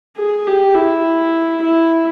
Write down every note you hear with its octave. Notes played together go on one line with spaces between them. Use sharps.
G#4
G4
E4
E4